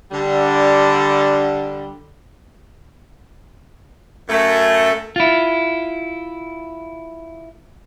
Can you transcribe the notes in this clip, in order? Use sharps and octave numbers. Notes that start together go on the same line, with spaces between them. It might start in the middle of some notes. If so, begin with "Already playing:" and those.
D3 G3
F#2 A3
E4 F4